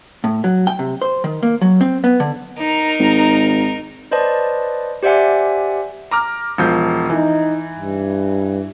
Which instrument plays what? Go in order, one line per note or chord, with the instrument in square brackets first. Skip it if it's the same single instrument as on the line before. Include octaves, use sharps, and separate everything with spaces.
[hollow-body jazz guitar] A2
F#3
G5
C3
C5
D#3
A#3
F#3
C4
B3
D3
[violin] D#4 A#4
[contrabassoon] G#1
[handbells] B4 C5 D5 D#5 A5
G4 C5 D5 E5 F#5 G#5
[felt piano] A#5 D6 F6
E1 F3 G6
[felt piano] E3 [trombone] D#4
[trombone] G2